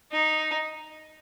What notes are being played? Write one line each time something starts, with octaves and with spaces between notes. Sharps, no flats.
D#4